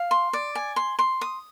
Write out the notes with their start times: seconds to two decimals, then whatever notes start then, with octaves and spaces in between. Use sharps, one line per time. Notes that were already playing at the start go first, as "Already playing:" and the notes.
Already playing: F5
0.11 C6
0.33 D5
0.55 G#5
0.76 C6
0.99 C6
1.21 D#6